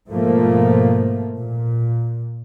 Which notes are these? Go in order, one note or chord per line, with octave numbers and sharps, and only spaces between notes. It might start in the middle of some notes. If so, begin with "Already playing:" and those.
G#2 B2 F3 A3 A#3
A#2